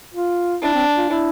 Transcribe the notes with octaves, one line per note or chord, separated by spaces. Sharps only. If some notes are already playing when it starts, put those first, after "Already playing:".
F4
D4 E4
C4
F4
E4